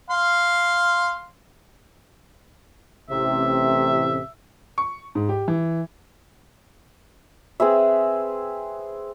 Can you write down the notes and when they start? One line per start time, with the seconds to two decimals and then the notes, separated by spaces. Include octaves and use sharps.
0.10 F5 C6
3.10 A1 C3 E5
4.78 C#6
5.15 G#2
5.29 G4
5.48 E3
7.60 C4 G#4 B4 E5